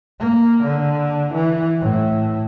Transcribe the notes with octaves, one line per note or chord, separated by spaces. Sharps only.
A#3
D3
E3
A2